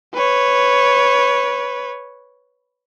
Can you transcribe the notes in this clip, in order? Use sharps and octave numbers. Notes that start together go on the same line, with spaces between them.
B4 C#5